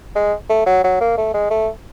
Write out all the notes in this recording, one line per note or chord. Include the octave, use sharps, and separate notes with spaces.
G#3
A3
F#3
F#3
A#3
A3
G#3
A3